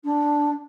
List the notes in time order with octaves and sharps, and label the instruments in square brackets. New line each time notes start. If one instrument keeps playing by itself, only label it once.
[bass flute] D4